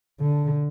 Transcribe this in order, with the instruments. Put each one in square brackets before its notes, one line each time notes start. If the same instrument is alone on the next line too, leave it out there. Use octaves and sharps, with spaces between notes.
[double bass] D3